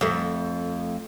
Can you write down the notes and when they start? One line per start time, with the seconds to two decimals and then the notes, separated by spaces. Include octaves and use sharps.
0.01 F2 A3